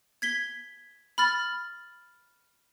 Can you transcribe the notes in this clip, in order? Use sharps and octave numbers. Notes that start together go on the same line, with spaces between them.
G#6 B6 G7
B5 F6 A6